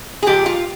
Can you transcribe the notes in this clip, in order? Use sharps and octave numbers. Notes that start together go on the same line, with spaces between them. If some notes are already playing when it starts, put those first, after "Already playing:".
G#4
A#2 F3 G#3 G4
F4